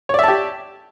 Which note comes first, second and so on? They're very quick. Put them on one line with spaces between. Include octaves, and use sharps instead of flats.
C#5 D5 E5 A5 G4